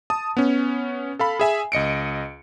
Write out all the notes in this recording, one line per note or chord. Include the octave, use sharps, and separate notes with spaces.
A5 D#6
B3 C#4
A4 F5 B5
G#4 E5 G#5
C#2 D#5 C#7 D7